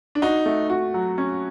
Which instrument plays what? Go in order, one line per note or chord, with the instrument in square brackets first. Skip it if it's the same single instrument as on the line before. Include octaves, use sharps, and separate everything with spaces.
[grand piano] D4
[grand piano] D#4 [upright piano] F#4
[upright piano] A3
F#4
F#3
C#4